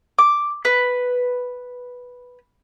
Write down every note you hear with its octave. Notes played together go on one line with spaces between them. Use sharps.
D6
B4